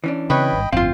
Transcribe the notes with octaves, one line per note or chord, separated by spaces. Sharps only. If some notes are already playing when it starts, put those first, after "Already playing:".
E3 C#4 D4
C#3 C4 B4 C#5 D#5 G5 B5
G#1 G2
G1 F2 A2 C4 F4 F5